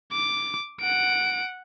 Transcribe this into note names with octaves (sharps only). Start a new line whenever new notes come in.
D6
F#5 D7